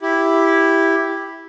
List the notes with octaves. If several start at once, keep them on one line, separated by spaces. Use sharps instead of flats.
E4 G4